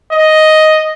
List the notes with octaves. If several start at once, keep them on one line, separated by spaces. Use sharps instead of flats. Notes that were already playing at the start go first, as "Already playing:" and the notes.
D#5